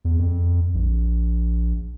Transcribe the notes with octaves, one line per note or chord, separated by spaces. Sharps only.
E2
F2
A#1